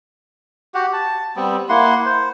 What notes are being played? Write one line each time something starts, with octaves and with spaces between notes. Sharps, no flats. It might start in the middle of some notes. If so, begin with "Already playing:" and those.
F#4 G4 F#5
A5
G3 B3 C4
A#3 E4 F#5 C6
C5